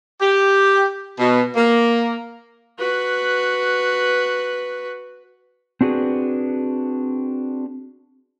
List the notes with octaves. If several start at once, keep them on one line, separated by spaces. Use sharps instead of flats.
G4
B2
A#3
F#4 B4
C4 D4 F#4 G#4 B4